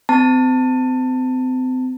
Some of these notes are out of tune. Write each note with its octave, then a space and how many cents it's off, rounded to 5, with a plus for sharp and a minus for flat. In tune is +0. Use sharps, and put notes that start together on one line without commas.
C4 -35 A5 +25